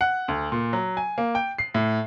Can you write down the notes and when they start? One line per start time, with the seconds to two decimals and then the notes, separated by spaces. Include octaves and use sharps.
0.01 F#5
0.28 D2
0.52 A#2
0.73 F#3
0.97 G#5
1.18 A#3
1.35 G5
1.58 C7
1.74 A2